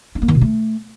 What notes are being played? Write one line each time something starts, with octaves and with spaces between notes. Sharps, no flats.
D4
A#3
D#3
B2
A3